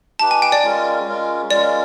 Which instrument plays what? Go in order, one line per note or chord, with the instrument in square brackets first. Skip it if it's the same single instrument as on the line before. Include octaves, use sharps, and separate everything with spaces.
[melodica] D#4 G4 B4 [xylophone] A5
[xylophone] G#5
G5
D5
[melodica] G#3 C#4 F4 A#4
G#3 C#4 F4 A#4
[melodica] G#3 C#4 F4 A#4 [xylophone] D5